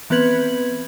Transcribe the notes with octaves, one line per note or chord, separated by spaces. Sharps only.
E3 B3 C4 B4 G#6 F#7